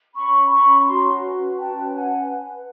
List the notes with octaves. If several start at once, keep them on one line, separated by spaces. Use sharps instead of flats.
C#4 B5 C#6
C#4 B5 C#6
F#4 A#5 C6
B4
C#4 G5 A5
B4 F#5 G#5